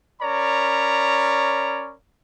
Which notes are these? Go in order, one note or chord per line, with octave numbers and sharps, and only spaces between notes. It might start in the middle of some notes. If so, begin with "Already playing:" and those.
C#4 A#4 C#5 D5 A#5 B5